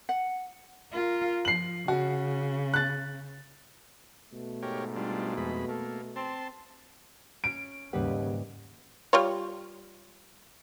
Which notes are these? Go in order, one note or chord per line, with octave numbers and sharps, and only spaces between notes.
F#5
F4 A#4
F3 C7 F#7
C#3 F#4
F#6 A6
B2 A3
G#2 G4 A#4 C#5
G3 D4 F4
F2 G#3 B5
A#3 A4
C4 A5 C6
C#4 D7
D#2 G#2 C#3 G3 A#3 G4 B4 F#5
G3 F4 C#5